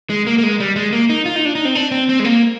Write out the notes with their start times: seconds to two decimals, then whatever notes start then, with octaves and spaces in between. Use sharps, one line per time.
0.10 G#3
0.27 A#3
0.38 A#3
0.43 G#3
0.60 G3
0.76 G#3
0.93 A#3
1.10 D#4
1.26 F4
1.36 D#4
1.45 D4
1.55 D#4
1.65 C4
1.75 D4
1.91 C4
2.09 C4
2.20 G#3
2.25 A#3